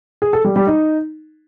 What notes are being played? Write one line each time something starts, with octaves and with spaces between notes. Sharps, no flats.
G#4
A4
G3
G3
D#4